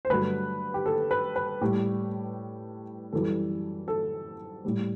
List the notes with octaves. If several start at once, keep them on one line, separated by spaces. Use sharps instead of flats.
C5
G2 D3 F#3 A3 B4
G4
A4
B4
B4
A2 G3 G4
F#2 E3 G3 A4
A4
A2 G3